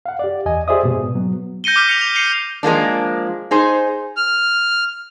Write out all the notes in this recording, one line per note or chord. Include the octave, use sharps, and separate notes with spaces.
F5 F#5
G4 D5
E2 D#5 G#5
G4 G#4 C5 D5 E5 D#6
G#2 B2
F#3 B3
G6 A#6 C#7 D#7 G7
D6 F6 B6
C#7 F7
F7
C7 C#7 D#7 F7 G7
F3 G#3 A#3 D4
D#4 G#4 C5
F6